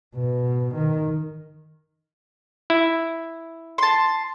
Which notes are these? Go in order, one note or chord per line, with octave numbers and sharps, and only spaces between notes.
B2
D#3
E4
A5 C6